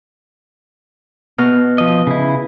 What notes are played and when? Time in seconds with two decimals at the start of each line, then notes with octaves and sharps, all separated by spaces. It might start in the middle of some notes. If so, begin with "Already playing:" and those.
1.38 B2 F6
1.78 F3 D#5
2.07 C#3 E4